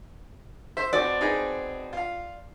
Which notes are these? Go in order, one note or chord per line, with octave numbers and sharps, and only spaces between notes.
C5 E5
B2 C4 F#4 D5
D#4 G#4 B4
F4 F5